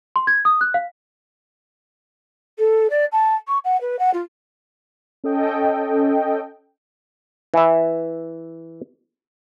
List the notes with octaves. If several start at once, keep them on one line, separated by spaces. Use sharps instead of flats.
C6
G#6
D#6
F#6
F5
A4
D5
A5
C#6
F#5
B4
F#5
F4
C#4 A4 D#5 G5
E3 E5